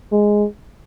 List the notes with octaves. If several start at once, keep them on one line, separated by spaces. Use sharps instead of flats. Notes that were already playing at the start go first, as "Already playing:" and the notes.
G#3